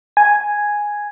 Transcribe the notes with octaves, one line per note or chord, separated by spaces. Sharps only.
G#5